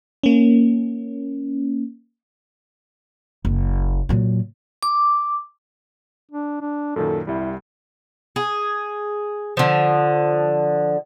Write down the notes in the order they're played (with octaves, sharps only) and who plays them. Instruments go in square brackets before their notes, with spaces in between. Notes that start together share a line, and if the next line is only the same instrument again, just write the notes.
[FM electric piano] A#3 C#4
[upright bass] F#1
A#2 F#3
[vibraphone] D6
[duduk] D4
D4
[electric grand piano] F#2 A#2 D#3 [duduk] A4
[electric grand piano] C2 G3 [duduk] E4
[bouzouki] G#4
D3 F3